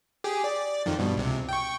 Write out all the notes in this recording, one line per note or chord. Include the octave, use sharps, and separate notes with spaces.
G4 G#4
D5
F2 D#3 F3
G2 B2
C#2 C3
G5 C#6